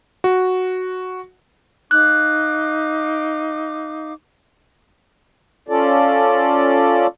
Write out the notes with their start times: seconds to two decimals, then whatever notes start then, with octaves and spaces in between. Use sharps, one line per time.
0.24 F#4
1.91 D#4 F5 D6 F#6
5.69 C#4 F4 A4 D5